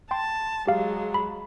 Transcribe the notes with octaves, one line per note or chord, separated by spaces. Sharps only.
G5 A5 C6
F#3 G#3 G4 F5
B5